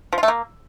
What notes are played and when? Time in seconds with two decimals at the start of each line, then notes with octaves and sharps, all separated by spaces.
0.12 F3
0.18 F4
0.23 A3
0.28 A#3